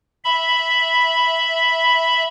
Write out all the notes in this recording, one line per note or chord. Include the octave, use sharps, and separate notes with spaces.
E5 B5